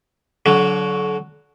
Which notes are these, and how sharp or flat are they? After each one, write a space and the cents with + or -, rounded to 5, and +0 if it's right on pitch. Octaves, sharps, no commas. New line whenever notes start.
D3 -35 F#3 +0